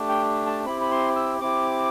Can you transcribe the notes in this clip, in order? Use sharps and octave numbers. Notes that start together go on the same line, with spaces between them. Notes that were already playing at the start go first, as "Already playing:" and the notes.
Already playing: A3 D4 G4
G5
A5
C4 E4 G4 B5
B5
C6
E6
C4 E4 G4 D6